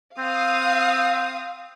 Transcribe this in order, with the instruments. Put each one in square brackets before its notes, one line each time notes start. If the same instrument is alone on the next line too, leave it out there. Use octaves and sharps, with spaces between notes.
[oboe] C4 [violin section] F5 D#6